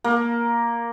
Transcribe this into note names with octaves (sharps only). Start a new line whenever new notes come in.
A#3